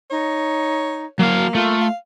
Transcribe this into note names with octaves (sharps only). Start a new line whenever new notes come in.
D#4 C#5
F#3 A#3 F5
A3 F4
F5